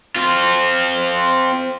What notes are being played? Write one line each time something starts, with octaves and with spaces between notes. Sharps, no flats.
C4 F4